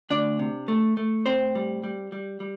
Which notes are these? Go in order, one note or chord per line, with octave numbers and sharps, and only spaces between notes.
D2 D4 D5
C3
A3
A3
A2 C4 C5
G3
G3
G3
G3